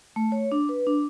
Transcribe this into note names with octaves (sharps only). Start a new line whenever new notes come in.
A3
C#5
D4
B4
D4